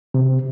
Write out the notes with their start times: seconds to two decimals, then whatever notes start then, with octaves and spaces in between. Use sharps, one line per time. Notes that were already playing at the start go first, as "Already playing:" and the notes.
0.14 C3